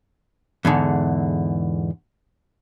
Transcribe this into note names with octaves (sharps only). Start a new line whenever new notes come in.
E2 G#2 D3